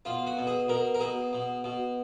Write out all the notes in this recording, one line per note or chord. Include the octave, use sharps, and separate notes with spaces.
B2 F4
F#4
B2
G#4
B2 A#4
A#4
B2 G#4
B2
B2